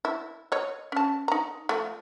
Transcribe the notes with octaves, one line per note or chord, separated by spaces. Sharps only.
E4
C#5 D#5
C#4 A5
D#4 A#5
F3 A3